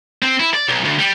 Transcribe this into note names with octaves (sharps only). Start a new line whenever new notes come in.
C4
E4
D5
B1
D2
G3